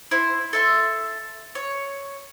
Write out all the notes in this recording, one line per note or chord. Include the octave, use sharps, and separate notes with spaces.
E4 C5
A4 E5 C6
C#5